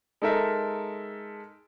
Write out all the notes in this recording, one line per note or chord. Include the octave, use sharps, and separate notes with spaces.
G#3 D#4 A4 A#4 E5